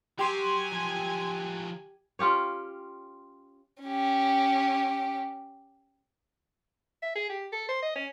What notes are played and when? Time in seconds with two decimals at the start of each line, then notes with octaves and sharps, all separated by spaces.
0.19 F#3 G4 G5 G#5 C6
0.72 F3 F#3
2.19 C#4 F4 G4 C#5
3.83 C#4 G4
7.02 E5
7.15 G#4
7.29 G4
7.52 A4
7.69 C5
7.82 D#5
7.96 C#4